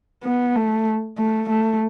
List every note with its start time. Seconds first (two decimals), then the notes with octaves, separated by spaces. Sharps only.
0.24 B3
0.55 A3
1.18 A3
1.49 A3